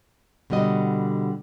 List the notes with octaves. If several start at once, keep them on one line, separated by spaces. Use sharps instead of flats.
B2 D3 G3 F#4 D#5